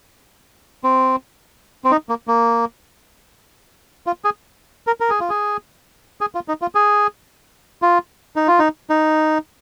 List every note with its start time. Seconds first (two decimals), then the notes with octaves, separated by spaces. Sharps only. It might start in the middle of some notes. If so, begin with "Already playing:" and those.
0.84 C4
1.84 C4
1.91 D#4
2.09 A#3
2.27 A#3
4.06 F4
4.24 G#4
4.87 A#4
5.00 A#4
5.10 G#4
5.20 F4
5.30 G#4
6.21 G#4
6.35 F4
6.48 D#4
6.62 F4
6.75 G#4
7.82 F4
8.36 D#4
8.48 F4
8.59 D#4
8.90 D#4